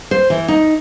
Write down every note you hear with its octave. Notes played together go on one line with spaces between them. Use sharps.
C5
E3
D#4